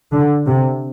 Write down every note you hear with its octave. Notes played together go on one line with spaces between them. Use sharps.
D3
C3